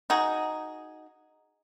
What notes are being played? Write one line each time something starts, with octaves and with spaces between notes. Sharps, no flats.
D#4 F#4 G#4